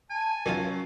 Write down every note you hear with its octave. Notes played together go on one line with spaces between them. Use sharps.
G#5 A5
D#3 F#3 C#4 D#4 F4